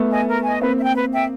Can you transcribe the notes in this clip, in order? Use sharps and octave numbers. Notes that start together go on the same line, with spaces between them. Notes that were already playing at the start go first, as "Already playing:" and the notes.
Already playing: A3 B3
D#5 G#5
A#4
D#5 G#5
A#3 C4 B4
E5
G5
B4
E5 G5